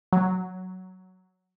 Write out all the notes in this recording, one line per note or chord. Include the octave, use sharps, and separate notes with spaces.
F#3